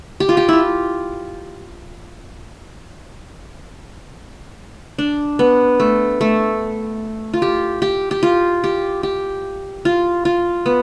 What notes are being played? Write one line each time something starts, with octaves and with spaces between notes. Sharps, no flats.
G4
F4
G4
E4 F4
D4
B3
A3
A3
F4
G4
G4
G4
F4
G4
G4
F4
F4
B3